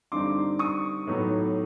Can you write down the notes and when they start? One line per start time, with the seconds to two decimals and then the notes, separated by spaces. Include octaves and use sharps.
0.12 G2 D3 G3 C4 D#4 C6 D6
0.59 C#6 D#6
1.07 A2 F#3 B3 D#4